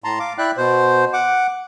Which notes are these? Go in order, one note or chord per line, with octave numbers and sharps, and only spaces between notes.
A2 A5 A#5 C6
F5 D6
E4 D5 E5 G5 F#6
B2 C5
F#5 D6